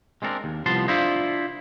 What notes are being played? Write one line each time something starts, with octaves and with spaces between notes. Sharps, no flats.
G#3 C4 D4 A4 A#4
D#2
C2 F3 B3 A5 C6
D4 E4 F4 C5 D#5